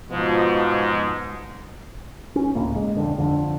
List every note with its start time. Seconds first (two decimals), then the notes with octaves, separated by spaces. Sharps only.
0.10 G#2 B2 F3 G#3
2.36 C#4
2.55 C#2 A2 A#3
2.76 G#3
2.97 B1 F2 D3
3.18 F2 D3